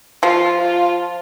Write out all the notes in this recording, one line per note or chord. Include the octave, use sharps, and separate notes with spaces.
F3 F4
F4